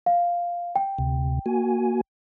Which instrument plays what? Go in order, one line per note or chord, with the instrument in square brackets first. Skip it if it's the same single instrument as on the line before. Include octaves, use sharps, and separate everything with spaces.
[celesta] F5
G5
[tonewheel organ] D2 C3
A#3 F#4 G#5